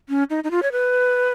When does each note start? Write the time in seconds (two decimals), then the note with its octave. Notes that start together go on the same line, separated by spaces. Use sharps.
0.09 C#4
0.30 D#4
0.44 D#4
0.51 F4
0.63 C#5
0.72 B4